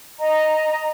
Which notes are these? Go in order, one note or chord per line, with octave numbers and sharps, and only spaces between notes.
D#5 A#5